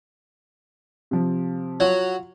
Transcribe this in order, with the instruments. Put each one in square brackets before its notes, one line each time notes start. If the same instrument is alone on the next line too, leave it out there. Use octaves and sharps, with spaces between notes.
[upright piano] C3 F3
[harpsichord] F#3 [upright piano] F4